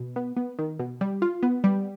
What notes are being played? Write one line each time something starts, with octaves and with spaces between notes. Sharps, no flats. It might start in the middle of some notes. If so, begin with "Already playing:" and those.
Already playing: B2
B3
B3
D#3
B2
G3
F4
B3
G3